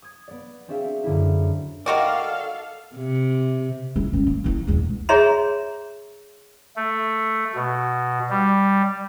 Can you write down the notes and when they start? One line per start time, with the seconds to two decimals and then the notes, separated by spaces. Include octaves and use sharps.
0.02 D#6 G#6
0.28 B3 D5
0.68 C4 D4 F#4 G#4 E5 F5
1.04 F#2 D3 D4 E4
1.86 D#3 F#4 A4 D5 F5
2.96 C3
3.96 E4
4.13 C#4
4.27 A#3
4.44 A#3 E4
4.67 B1 E2
5.09 G#4 C#5 E5 A#5 C6
6.76 A3
7.55 B2
8.30 G3